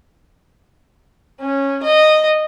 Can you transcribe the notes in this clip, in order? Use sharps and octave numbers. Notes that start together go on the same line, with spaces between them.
C#4
D#5